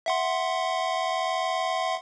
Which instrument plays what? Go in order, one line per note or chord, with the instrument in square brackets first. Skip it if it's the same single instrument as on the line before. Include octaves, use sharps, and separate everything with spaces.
[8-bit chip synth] E5 F#5 C6